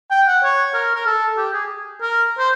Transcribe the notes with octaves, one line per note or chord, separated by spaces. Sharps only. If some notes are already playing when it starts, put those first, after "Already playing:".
G5
F#5
C#5
A#4
A#4
A4
G4
G#4
A#4
C5